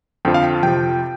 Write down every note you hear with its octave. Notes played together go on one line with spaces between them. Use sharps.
F2 D3 F3 G5
F5
G5
A5
F2 C3 F3 G5